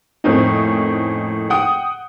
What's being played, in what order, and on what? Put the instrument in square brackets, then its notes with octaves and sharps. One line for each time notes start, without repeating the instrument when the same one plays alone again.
[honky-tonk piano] F2 A2 A#3 C4 C#4 D#4
F#5 G5 D#6